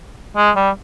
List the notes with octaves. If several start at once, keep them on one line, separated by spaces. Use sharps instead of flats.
G#3
G3